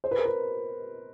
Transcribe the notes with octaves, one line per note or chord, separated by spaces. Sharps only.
C5
B4
A#4
B4